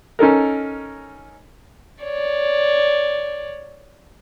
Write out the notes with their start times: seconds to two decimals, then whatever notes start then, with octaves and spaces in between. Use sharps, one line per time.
0.19 C#4 D#4 A4 A#4
2.03 C#5 D5